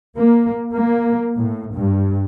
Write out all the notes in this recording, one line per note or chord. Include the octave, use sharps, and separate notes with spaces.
A#3
A#3
A2
G2